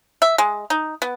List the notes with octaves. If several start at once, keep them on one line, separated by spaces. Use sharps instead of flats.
E5
G#3
D#4
B3